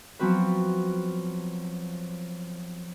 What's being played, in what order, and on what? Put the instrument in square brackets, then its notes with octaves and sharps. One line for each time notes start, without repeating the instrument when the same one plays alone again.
[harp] F3 F#3 B3 C4 F#4 B4